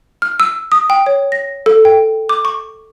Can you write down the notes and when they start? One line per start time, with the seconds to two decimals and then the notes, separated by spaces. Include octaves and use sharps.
0.22 F6
0.40 E6
0.72 D#6
0.90 G5
1.06 C#5
1.32 A#6
1.66 A4
1.85 G5
2.29 D6
2.45 C#6